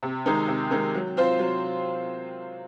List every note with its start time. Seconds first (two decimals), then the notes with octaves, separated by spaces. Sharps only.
0.03 C3
0.26 D#3 G#3 D#4 A#4
0.48 C3
0.71 D#3 G#3 D#4 A#4
0.94 F#3
1.17 C4 F4 C5
1.39 F#3